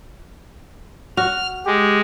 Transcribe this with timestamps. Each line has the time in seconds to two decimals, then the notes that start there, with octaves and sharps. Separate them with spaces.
1.17 F#4 F6
1.66 G#3 G4